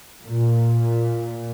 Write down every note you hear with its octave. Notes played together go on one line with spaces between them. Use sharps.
A#2